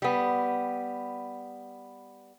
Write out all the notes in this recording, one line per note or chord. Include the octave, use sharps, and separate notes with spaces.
G3 B3